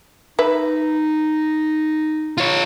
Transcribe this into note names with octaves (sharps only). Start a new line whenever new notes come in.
D#4 B4 E5
F4 C#5